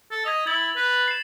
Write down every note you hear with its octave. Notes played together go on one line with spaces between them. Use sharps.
A4
D#5 G#6 B6 F7
E4 G#6 A6 F#7
B4
C7 E7